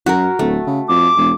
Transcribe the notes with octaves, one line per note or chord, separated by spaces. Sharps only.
F#2 F#4 A#4
D1 A3
C#3
F2 D6
E1